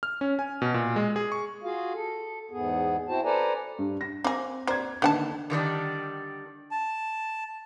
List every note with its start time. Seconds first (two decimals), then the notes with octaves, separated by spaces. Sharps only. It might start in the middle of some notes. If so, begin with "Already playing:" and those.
0.03 F6
0.21 C#4
0.39 G#5
0.62 B2
0.74 A#2
0.96 G#3
1.16 G#4
1.32 C#6
1.64 F4 F#4 G#4 F5
1.94 A4
2.51 E2 G#2 B3 G#4
3.08 C4 E4 F#4 C5 A5
3.24 A4 B4 C5 D5 G#5 A#5
3.79 G2
4.01 A#6
4.24 A#3 C4 G#4
4.67 A#3 C5 D5 G#6
5.02 D3 D#3 A#3 B3 F#5 A5
5.50 D3 D#3 G3 D4
6.71 A5